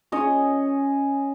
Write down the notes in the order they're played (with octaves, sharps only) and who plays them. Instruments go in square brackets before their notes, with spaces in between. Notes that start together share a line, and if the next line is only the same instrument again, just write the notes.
[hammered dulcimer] C#4 C#5 D#5 G#5